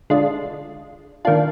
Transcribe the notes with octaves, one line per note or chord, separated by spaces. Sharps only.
D3 G#3 D4 F4
D#3 A#3 D4 F4